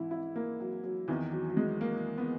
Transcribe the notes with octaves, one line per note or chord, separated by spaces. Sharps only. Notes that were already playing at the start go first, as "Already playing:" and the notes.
Already playing: G#2 E3 E4
E4
A#3
F#3
F#3
E2 D#3 E3
F#3
F#3
G#3
A#3
B3